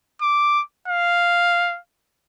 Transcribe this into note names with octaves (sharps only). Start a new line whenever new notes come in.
D6
F5